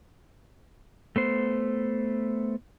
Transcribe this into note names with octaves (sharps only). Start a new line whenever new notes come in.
A3 B3 C5